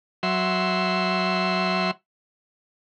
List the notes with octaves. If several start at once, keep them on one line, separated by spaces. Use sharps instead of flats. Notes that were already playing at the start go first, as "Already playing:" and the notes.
F#3 E5 C6